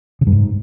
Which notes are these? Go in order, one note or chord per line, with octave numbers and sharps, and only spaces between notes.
C#3
G2
G#2